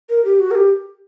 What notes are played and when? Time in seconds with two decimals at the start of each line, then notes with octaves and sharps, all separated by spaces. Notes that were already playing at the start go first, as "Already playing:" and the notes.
0.09 A#4
0.25 G4
0.40 F#4
0.51 A#4
0.55 G4